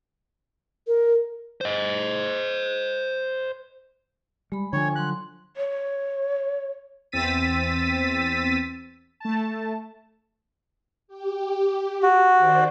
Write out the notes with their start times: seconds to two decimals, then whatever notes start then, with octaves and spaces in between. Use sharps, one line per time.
0.87 A#4
1.61 C5 D#5
4.52 G3 G#3 B5
4.73 D3 F3 C#5 G5 G#5
4.96 F#3 C6 F#6
5.57 C#5
7.12 E2 C4 E6 A6 B6 D#7
9.20 A3 A5
11.08 G4
12.03 F#4
12.38 D#3 C5 D5